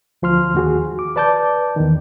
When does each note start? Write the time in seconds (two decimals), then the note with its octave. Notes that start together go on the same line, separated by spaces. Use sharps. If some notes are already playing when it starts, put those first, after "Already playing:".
0.22 D2 F3 C6 F6
0.55 D#2 F#4 G#4
0.99 D6
1.16 B4 D5 A5 D6 G6
1.76 E2 D#3